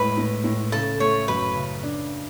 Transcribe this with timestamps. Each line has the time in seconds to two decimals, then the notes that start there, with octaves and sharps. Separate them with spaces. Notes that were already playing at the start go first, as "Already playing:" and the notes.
Already playing: A2 G#3 B4
0.18 A2
0.44 A2
0.72 C#3 A4
1.00 A3 C#5
1.28 F#2 B4
1.55 C#3
1.83 D4